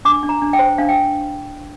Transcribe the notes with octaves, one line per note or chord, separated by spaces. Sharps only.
D4 D6
D4
A#5
D4
G5
C5
D4 F5
G5